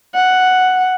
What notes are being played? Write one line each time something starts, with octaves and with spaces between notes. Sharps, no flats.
F#5